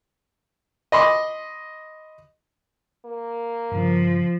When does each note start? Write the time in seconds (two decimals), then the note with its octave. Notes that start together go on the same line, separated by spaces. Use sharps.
0.92 D#5 B5 C6 D6
3.05 A#3
3.72 G2 C#3 F3